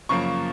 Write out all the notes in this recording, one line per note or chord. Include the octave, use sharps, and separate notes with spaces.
F#2 C#3 F3 A#3 C#6